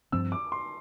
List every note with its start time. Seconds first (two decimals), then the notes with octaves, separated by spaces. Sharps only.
0.12 G2 F3 C4 E6
0.32 D6
0.52 C6